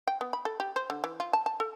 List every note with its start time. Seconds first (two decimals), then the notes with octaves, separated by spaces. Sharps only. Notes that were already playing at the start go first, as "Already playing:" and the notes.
0.07 G5
0.21 B3
0.33 B5
0.45 A4
0.60 G4
0.76 C5
0.90 D3
1.04 E3
1.20 F4
1.33 A5
1.46 A5
1.60 A4